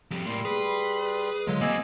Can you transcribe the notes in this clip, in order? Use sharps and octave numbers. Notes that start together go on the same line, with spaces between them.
F2 G3
A2 G3 A#3 C6
G#4 B4
D3 F#3 G#3 F4
G3 A#3 C4 D#5 G#5 E6